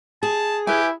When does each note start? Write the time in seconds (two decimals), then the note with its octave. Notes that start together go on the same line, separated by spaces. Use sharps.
0.23 G#4 A5
0.67 E4 G4 B4 G#5